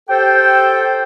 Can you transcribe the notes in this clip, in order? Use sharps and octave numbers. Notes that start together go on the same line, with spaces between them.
G4 A4 C5 G5